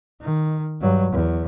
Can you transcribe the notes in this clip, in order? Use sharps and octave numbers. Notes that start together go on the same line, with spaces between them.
D#3
G2 F#3
E2